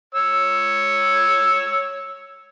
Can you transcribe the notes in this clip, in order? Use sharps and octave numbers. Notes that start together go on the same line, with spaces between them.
C#5 E6